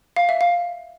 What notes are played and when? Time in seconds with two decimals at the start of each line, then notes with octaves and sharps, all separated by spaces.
0.16 F5
0.29 E5
0.41 F5